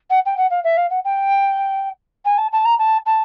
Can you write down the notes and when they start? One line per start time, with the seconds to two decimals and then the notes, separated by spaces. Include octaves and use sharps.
0.10 F#5
0.26 G5
0.37 F#5
0.50 F5
0.64 E5
0.77 F5
0.90 F#5
1.04 G5
2.25 G#5
2.38 A5
2.52 A5
2.65 A#5
2.79 A5
3.06 A5